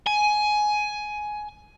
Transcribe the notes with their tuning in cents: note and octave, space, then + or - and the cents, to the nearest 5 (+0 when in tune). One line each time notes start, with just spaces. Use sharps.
G#5 +15